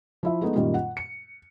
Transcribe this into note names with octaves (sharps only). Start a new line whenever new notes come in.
F3 E4 E5
G#3 A3 B3 D#4
F#2 A#2 D#3 G3 F4
F#5
C#7